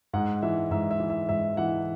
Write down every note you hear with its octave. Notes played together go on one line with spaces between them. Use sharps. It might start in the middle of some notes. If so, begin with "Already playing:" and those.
G#2 F#5
E3 E5
G#2 E5
E5
E3
E5
G#2 E5
E3 F#5